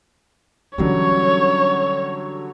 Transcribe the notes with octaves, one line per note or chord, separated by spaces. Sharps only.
D3 E3 F#3 G3 C#4 C#5